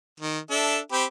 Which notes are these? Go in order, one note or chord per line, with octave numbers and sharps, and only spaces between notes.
D#3
D4 A4 E5
C4 G4 B5